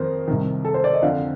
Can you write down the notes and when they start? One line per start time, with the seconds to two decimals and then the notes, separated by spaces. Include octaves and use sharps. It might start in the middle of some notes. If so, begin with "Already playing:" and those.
Already playing: F2 D#3 A#4 C5
0.28 C2 C3 D#3
0.65 A4
0.74 C5
0.84 D5
0.93 D#5
1.02 F2 D3 F5